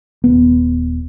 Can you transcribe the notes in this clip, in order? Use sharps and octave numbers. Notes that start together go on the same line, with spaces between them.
D#1 B3